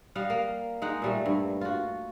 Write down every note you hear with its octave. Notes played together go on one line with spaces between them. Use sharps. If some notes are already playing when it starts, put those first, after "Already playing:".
G3 D#5 F5 F#5
A#3
G#3 D#4 F#5
A#2 G3 A3
G2
F4 F#4